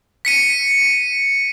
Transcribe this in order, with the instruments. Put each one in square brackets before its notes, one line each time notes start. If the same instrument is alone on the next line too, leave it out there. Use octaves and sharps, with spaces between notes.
[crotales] B6 C#7 D#7